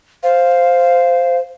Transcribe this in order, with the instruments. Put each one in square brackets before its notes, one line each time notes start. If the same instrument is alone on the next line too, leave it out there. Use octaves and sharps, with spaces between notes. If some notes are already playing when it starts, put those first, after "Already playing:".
[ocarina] C5 [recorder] F5